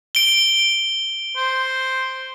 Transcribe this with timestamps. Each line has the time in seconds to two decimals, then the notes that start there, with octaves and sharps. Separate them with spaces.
0.15 D7 G7
1.37 C5